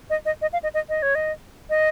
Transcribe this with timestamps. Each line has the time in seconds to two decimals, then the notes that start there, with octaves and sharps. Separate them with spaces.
0.10 D#5
0.25 D#5
0.42 D#5
0.53 F5
0.63 D#5
0.74 D#5
0.89 D#5
1.02 C#5
1.15 D#5
1.70 D#5